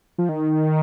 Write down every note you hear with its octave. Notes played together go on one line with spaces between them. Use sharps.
F3
D#3